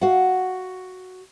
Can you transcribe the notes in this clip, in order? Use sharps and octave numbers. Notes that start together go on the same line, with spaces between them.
F#4 F5 F#5